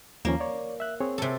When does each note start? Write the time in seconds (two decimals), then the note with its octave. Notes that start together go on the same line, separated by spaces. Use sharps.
0.25 D#2 F3 A#3 C#4
0.40 C#5 D5
0.80 E5 F#6
1.00 C4 G#4 C#5
1.18 C3 A4